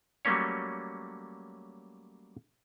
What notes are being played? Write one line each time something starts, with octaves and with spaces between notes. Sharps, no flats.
F#3 G3 A3 A#3 C#4 C#5